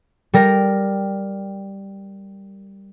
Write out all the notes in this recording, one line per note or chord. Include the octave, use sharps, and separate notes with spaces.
G3 A#4 A#6